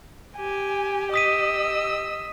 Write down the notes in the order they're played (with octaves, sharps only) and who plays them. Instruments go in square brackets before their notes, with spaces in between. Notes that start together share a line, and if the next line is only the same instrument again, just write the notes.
[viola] G4 [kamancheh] G#5
[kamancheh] D#5 E6 [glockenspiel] D#6 B6 D#7